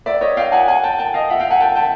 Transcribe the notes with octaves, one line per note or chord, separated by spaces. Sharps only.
D5 E5
C#5 D#5
F5 G5
F#5 G#5
F#5 G#5
G5 A5
G5 A5
D#5 F5
E5 F#5
F5 G5
F#5 G#5
G5 A5
G5 A5